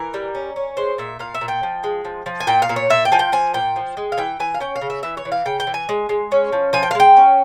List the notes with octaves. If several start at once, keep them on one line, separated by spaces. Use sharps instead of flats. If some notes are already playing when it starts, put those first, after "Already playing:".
Already playing: E3 A#4
G3
C#4
C#4
G#3 C5
A#2 E5
A#2 F5
E5
A#2
G5
F3
G#3
F3
F3
G#5
A#2 G5
F5
A#2
C#5
A#2 E5
G5
F3 G#5
G5
F3 G#5
A#2 G5
F3
G#3
F5
E3 G5
E3 G#5
F5
C#4 G5
F5
C#3
E5
E3 E5
C#5
E3
F5
C#3 G5
G5
E3
G#5
G#3
G#3
C#4
F3
F3 G#5
G5
F5
G#3 G5
C#4